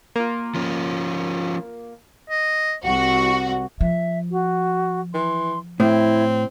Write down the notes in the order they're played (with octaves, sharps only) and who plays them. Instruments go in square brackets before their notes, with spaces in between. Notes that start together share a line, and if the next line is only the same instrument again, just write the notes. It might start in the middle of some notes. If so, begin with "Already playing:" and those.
[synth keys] A#3 F4
[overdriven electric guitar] F3 C#4
[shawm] D#5
[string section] C2 F#4 [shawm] C#6
[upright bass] F3 [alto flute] E5
[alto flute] F#4
[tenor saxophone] E3 [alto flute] C6
[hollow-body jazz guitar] A2 [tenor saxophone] C4 [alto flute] E4